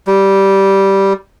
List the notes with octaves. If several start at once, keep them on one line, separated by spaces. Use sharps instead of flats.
G3